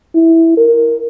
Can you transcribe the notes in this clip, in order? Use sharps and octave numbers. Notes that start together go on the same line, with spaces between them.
E4
A#4